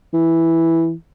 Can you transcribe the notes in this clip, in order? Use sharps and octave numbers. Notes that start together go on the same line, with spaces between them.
E3